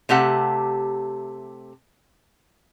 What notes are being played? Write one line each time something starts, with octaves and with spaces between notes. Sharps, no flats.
C3 A3 G4 F#5